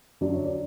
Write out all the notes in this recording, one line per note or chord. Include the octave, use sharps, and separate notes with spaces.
F#2 D3 F#3 D5
C#5
D5